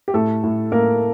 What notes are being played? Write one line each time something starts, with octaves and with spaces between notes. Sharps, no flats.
G4
A2 A3 A4
A2
A2 A#3 A#4